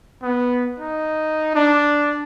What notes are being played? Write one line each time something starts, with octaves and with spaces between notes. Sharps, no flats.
B3
D#4
D4